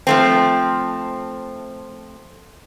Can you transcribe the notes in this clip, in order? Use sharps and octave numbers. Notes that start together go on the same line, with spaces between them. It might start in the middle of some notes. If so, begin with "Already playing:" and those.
F3 A3 C4